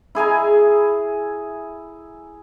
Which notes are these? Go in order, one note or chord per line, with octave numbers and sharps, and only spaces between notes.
E4 G#4 G#5 A#5